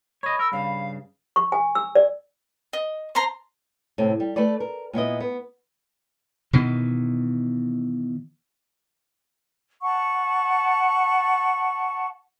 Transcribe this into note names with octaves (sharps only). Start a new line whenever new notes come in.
C#5 D#5 B5
A#4 E6
G2 C#3 F5
C#6
G#5
E6
D5
D#5
C5 A5 A#5 C6
A2 C3
G3
A3 A4 B4 D5
A#4
A#2 B3 E4 D#5
B3
B2 D#3 E3
F#5 A5 C#6